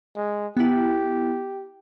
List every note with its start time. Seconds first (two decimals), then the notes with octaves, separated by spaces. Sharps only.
0.17 G#3
0.57 B3 E4 G4